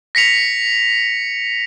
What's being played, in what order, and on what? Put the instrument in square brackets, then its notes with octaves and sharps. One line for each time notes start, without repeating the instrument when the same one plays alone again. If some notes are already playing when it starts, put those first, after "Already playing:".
[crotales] A#6 B6 C#7 F7